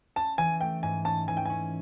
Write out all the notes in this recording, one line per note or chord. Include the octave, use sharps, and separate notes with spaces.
C#4 A5
E3 G#5
A3 G5
G#2 G#5
C#4 A5
E3 G#5
G5
C#4 G#5